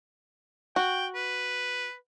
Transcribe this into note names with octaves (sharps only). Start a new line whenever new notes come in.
F#4 G5
B4